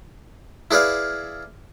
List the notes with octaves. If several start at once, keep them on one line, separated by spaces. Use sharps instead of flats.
E4 G#4 B4 D5 F5